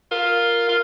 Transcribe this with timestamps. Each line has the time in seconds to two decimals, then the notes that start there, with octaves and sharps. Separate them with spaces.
0.11 F4 A#4
0.69 F4